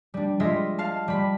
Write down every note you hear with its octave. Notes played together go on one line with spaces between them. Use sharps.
G3 D4
G3 G#3 F4 D#5 E5
F5 A5
G3 B5